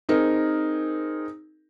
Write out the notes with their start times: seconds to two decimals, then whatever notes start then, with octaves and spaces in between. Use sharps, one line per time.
0.09 C4 D#4 G#4 A#4